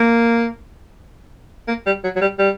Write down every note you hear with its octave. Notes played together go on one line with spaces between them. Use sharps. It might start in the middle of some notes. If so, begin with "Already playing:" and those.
Already playing: A#3
A#3
G3
F#3
F#3
G3
G3